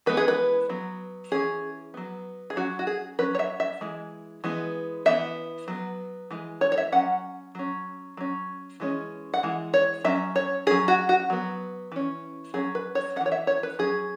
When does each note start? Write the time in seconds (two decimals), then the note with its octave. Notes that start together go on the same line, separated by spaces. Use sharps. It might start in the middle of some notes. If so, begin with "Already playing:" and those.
0.06 E3 G#3 B3 B4
0.17 G#4
0.28 B4
0.69 F#3 B3
1.32 E3 C#4 G#4
1.94 F#3 B3
2.50 G#4
2.56 F#3 C#4 F#4
2.79 F#4
2.87 G#4
3.19 F#3 C#4 B4
3.35 C#5
3.39 E5
3.60 E5
3.81 E3 G#3
4.44 E3 G#3 B3
5.06 E3 B3 E5
5.68 F#3 B3
6.30 E3 G#3
6.61 C#5
6.72 C#5
6.78 E5
6.92 F#3 C#4 F#5
7.55 F#3 C#4
8.17 F#3 C#4
8.80 E3 G#3 C#4
9.34 F#5
9.43 E3 G#3
9.74 C#5
10.04 F#3 C#4 E5
10.36 C#5
10.67 C#4 G#4
10.71 F#3
10.88 F#4
11.09 F#4
11.30 F#3 B3
11.92 E3 C#4
12.54 F#3 C#4 G#4
12.75 B4
12.95 C#5
13.16 C#4 F#5
13.21 E3
13.26 C#5
13.32 E5
13.47 C#5
13.63 B4
13.79 F#3 C#4 G#4